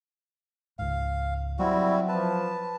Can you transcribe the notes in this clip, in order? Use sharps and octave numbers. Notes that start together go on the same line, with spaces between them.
C#2 G#2 F5
F#3 G3 C4 E4 F#4
F3 B4 A5